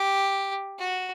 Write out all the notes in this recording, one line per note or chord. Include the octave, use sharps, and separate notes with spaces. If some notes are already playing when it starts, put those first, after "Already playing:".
Already playing: G4
F#4